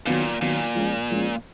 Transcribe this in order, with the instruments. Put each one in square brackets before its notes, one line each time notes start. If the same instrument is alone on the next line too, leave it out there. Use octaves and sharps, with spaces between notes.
[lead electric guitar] A#2 [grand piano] D#3 F#3 B3
[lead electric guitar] A#2 [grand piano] D#3 F#3 B3
[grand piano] F3 G#3 C#4
F3 G#3 C#4